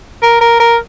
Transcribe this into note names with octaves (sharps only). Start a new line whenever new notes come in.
A#4
A#4
A#4